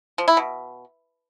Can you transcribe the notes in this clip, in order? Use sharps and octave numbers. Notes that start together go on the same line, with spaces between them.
F3
E4
B2